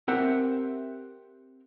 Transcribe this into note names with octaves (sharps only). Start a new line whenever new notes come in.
C4 G4 A#4 E5 F#5